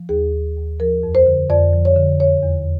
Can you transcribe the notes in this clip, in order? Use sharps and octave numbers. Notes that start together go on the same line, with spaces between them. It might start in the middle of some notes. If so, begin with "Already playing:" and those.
Already playing: F3
D#2 G#4
D#2
D#2
F3 A#4
F2
C5
D3
F2 D5
F3
C#5
D3
E2 C#5
E2